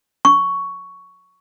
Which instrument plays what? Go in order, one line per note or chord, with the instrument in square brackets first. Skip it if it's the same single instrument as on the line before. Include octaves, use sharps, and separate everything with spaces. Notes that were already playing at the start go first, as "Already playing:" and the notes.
[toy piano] C#6